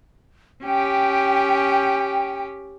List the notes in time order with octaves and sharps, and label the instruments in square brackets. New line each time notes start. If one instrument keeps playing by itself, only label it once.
[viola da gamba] C#4 G4 [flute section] G5